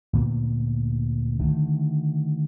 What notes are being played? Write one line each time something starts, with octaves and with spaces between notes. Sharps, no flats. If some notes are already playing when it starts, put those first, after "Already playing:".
D2 A#2 A#3 B3
D3 D#3 F#3 A3